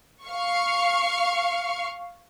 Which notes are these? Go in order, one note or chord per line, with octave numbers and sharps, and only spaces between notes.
F5 C#6